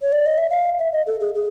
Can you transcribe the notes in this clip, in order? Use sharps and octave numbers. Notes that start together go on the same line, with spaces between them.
C#5
D5
D#5
E5
F5
E5
D#5
A4
G#4
G#4